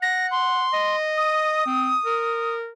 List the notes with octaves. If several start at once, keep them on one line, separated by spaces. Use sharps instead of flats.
F#5 A#6
C6
D#5
D#6
C4
A#4